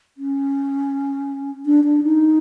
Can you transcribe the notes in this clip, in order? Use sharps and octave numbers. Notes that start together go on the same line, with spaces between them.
C#4
D4
D4
D#4